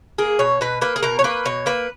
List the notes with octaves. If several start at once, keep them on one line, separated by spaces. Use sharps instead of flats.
A#3 G#4
B2 C#5
B2 B4
A#3 B4
G#4
B2 A#4
C#5
A#3 B4
B2 C#5
A#3 B4